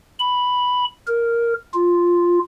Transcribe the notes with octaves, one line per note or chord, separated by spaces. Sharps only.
B5
A#4
F4